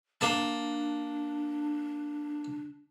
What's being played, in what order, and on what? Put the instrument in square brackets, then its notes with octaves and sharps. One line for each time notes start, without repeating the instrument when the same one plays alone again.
[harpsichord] A#3 A5 [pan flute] D4